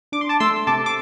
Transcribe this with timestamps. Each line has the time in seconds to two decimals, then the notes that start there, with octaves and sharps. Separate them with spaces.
0.12 D4 D6
0.21 C6
0.29 A5 D6
0.40 A3 C6 E6
0.67 C3 A5 D6
0.86 D6